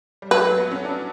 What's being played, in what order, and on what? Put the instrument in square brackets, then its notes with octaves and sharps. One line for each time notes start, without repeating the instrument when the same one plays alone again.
[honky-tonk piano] G3
[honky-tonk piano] F#3 [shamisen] B4
[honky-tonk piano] A3
B3
C#4
D4